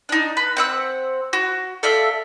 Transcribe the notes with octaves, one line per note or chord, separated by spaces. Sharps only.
D4 D#4
B4
C4 F#5 E6
F#4
A4 D5 E5 F5